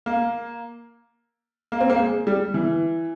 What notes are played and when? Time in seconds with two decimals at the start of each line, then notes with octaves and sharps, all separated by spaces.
0.06 A#3
1.72 A#3
1.80 C4
1.90 A#3
1.99 G#3
2.27 G3
2.54 E3